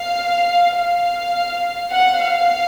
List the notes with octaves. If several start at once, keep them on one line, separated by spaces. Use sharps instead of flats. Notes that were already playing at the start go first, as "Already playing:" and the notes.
Already playing: F5
F5
F#5
F5